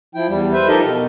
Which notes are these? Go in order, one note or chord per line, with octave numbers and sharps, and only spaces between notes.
F3 E4 G5
E2 G3
B4 C5 E5
F3 D#4 G4 A4 A#4 D#5
B2